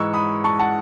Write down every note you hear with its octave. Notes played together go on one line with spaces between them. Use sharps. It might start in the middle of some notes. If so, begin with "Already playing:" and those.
Already playing: G#2 E3 G#3 C#6 E6
B5 D#6
A5 C#6
F#5 A5